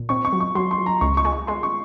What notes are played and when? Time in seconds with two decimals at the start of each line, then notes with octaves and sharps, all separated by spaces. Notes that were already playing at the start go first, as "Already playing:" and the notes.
Already playing: A#2
0.09 C4 C#6
0.25 C#6
0.33 F#3
0.40 C#6
0.55 F#3 C6
0.71 C6
0.78 F#3
0.86 A#5
1.01 C#2 C#6
1.17 C#6
1.25 G#3
1.32 C#6
1.47 G#3 C6
1.63 C#6